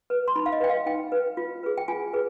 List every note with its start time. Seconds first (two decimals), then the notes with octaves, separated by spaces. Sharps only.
0.10 B4
0.28 C6
0.36 D#4 B5
0.46 F5
0.52 D#5
0.60 B4 G5
0.70 F5
0.86 D#4 G5
1.12 B4
1.37 F4
1.63 G#4 B4
1.78 G5
1.88 F4 G#5
2.13 G#4 B4